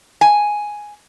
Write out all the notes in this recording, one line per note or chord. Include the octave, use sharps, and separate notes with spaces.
G#5